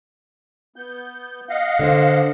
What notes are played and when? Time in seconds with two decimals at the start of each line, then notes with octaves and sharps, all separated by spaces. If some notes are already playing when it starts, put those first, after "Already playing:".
0.76 B3 G6
1.49 D#5 F5 F#5
1.79 D3 D4 C5